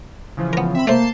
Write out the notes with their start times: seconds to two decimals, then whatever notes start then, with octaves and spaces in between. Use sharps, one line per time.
0.37 C#3 E3 F3
0.53 B3 A#4
0.75 C4 E5 B5
0.87 A3 A#3 C5 A5 G6 C7